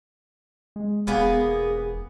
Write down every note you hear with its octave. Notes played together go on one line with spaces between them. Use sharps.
G#3
E1 A#3 B3 G#4